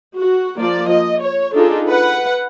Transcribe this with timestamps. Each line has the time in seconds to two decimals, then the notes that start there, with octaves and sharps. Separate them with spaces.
0.16 F#4
0.58 F3 A#3 D5
0.89 D#5
1.21 C#5
1.55 D4 D#4 F4 G#4 A4
1.87 B4 F#5